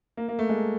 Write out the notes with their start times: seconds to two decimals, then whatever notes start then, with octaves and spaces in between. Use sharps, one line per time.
0.17 A#3
0.29 A#3
0.39 A3
0.49 G#3